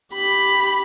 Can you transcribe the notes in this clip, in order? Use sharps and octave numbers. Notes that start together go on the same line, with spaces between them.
G4 B5